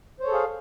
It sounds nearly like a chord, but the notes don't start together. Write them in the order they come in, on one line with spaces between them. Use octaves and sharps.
C5 C#5 A4 G#4 F5